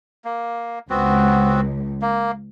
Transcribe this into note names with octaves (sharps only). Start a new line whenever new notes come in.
A#3
C#2 B3 C4 F#4
A#3